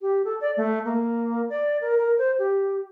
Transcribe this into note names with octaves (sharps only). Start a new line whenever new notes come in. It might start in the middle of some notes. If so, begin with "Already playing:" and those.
G4
A4
D5
A3
A#3
D5
A#4
A#4
C5
G4